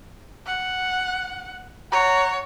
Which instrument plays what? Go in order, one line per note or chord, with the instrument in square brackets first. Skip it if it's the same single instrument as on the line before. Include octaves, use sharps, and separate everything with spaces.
[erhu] F#5
[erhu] C#5 [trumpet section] F#5 A#5